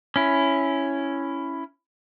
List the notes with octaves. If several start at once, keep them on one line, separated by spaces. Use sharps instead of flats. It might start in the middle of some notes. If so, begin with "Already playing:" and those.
C#4 E4